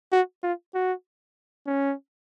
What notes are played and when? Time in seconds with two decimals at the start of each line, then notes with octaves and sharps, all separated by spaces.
0.12 F#4
0.43 F4
0.74 F#4
1.66 C#4